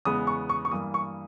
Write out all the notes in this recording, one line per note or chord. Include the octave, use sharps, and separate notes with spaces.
E2 C#3 G#3 B3 D#6
C#6
C#6
C#6
G2 E3 A#3 D#6
C#6